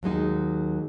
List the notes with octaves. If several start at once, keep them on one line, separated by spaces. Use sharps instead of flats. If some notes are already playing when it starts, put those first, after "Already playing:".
D#2 F#3 G#3 D#4